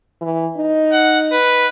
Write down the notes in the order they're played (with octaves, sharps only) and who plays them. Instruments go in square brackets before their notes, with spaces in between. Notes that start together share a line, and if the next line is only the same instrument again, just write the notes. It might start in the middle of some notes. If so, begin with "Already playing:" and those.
[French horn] E3
D#4
[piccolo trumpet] F#5
B4